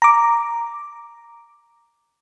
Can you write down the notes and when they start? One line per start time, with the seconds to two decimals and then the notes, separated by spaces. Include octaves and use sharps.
0.02 A#5 D6